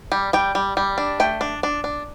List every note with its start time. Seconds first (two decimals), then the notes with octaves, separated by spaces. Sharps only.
0.12 G3
0.33 G3 G5
0.55 G3
0.77 G3
0.98 D4
1.20 A3 G5
1.41 D4
1.63 D4
1.84 D4